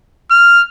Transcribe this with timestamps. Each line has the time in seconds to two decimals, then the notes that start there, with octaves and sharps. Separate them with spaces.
0.31 F6